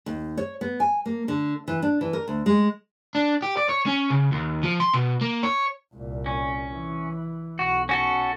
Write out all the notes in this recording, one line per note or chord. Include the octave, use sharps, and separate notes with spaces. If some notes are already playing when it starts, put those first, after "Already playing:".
D#2
C#5
B3
G#5
A#3
D3
E3
D4
E3
A#4
D2
G#3
D4
G4
D5
C#5
C#4
C#3
D#2
F3
C6
B2
A#3
C#5
C2 A#2
C#4
E3
B1 F#4
C#4 F#4 A4